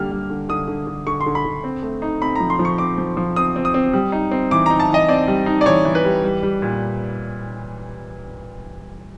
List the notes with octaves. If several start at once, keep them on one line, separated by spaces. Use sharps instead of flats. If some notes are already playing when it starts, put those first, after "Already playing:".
Already playing: D3 G3 A#3 F6
G3
D3
D3 D#6
D3
D3
D3 C#6
C6
D3
B5
D3
C4
A3
D#4
C4 B5
F3 A#5
C6
F3
C#6
C4 D6
F3
F3
C4 D#6
C4
D#6
C4
G3
D#4
C4
E3 D6
D#4 A#5
A5
E3 D#5
C4 D5
G3
D#4
D5
E3 C#5
E3
B4
G3
G3
G3
A#2